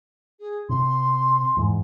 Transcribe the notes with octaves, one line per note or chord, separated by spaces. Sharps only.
G#4
C3 C6
E2 G#2